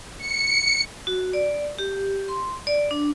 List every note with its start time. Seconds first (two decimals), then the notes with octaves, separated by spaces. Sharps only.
0.18 C#7
1.07 F#4
1.33 D5
1.79 G4
2.28 C6
2.67 D5
2.91 D4